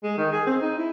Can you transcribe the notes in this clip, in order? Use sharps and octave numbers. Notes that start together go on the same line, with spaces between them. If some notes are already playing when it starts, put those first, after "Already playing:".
G#3
D#3
G#4
C4
D#4
E4